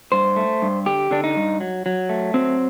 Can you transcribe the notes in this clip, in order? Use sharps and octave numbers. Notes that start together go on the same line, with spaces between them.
G2 C5
A3
G2
D3 G4
D3 D4
D#4
G2
F#3
F#3
A3
F#3 C4